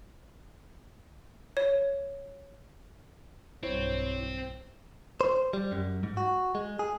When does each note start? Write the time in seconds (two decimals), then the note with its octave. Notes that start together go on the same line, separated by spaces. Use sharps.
1.57 C#5
3.63 B1 G2 C4 E4 C5 C#5
5.21 C5
5.53 G3
5.72 F#2
6.03 G#2
6.17 F#4
6.55 G#3
6.79 G#4